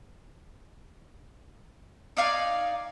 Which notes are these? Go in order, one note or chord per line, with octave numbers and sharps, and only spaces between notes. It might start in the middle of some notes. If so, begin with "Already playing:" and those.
D#4 D5 F5 G#5